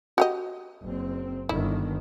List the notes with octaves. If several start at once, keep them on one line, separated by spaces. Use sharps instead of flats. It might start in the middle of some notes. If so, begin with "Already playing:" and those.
F#4 G4 D#5
F#1 C4
G1 D#3 E4